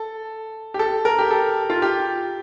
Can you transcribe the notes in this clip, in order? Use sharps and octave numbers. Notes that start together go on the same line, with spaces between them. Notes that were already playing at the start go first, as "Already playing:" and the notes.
Already playing: A4
G4
A4
A#4
G4
A4
F4
G4